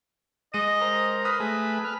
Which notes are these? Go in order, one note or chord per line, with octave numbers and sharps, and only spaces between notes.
G#3 D#5 D#7
A#4 C5
B4 D#6 F6 A#6
A3 G#4
B4 F6